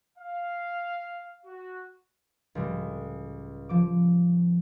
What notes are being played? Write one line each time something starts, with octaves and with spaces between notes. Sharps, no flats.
F5
F#4
C#2 A2 G3
F3 D6